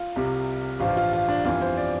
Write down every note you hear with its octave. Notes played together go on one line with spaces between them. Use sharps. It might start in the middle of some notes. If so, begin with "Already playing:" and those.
Already playing: F4
C2 C3 G3
A1 G2 F3 F4
F4
F4
D4
G1 F2 E3 G3 F4
C5
D5